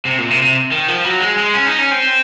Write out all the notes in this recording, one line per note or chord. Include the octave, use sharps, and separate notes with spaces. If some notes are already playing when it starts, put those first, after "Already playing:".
C3
A#2
C3
C3
D#3
F3
F#3
G#3
G#3
C#4
D#4
C#4
C4